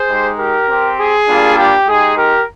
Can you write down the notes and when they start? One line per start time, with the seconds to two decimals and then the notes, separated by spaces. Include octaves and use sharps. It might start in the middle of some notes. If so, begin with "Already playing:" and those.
Already playing: G#4 C5
0.09 G#3 D#4 G4
0.38 G4 A#4
0.68 C4 G4
0.98 G#4
1.28 G3 A#3 D4 F4
1.57 G4
1.87 G#3 D#4 G4 G#4
2.16 G4 A#4